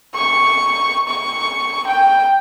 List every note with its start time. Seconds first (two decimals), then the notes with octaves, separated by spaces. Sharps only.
0.15 C#6
1.08 C#6
1.87 G5